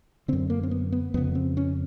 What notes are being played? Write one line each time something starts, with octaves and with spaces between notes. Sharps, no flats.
F#2 D3 C4
A#3
C4
B3
B3
F2 C#3 B3
C4
C#4